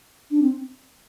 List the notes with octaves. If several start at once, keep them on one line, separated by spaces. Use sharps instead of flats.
D4
C4